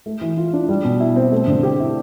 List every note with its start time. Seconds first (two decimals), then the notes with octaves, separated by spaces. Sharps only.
0.06 A3
0.21 E3
0.37 F4
0.53 D4
0.69 G3
0.84 B2
1.00 E4
1.16 C4
1.32 A3
1.48 D3
1.63 G4
1.80 E4